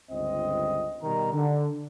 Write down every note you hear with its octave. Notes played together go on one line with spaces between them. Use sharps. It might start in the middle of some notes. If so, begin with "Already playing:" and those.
G1 C#2 C4 D#5
B2 D#3 G3 A#5
D3